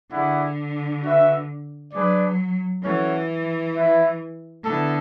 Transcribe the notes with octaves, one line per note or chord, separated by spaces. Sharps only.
D3 E4 G#4 D5 F#5
F#4 B4 E5
F#3 D4 G#4 B4 D5
E3 C#4 F#4 A4 C#5
E4 B4 E5
D3 B3 E4 A4